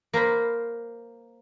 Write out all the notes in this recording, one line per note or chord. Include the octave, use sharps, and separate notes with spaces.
A#3 A#4 C5 B5